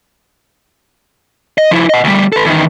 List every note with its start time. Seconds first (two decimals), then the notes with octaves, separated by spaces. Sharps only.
1.58 D#5
1.71 F3 E4
1.89 D#5 F#5
2.04 D2 G3
2.33 A4 B4
2.46 E2 D#3